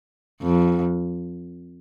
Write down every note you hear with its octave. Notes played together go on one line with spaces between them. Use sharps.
F2